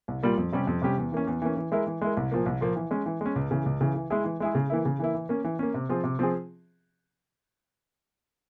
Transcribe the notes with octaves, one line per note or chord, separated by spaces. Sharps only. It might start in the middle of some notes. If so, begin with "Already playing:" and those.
C2
A#2 G3 A#3 F4
F2
C3 G3 C#4 G4
F2
C3 G3 C#4 G4
E2
E3 A#3 C#4
E2
E3 A#3 C#4
E3
G#3 E4 A#4
E3
G#3 E4 A#4
C2
A#2 F3 A#3
C2
A#2 F3 A#3
E3
G#3 C#4
E3
G#3 C#4
C#2
C#3 E3
C#2
C#3 E3
E3
G#3 E4 G#4
E3
G#3 E4 G#4
C#3
E3 A#3 E4
C#3
E3 A#3 E4
E3
A#3 C#4
E3
A#3 C#4
C3
F3 C4 F4 G#4
C3
F3 C4 F4 G#4